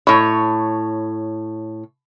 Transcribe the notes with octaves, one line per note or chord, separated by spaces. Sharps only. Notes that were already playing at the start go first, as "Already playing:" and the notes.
A2 C#5 B5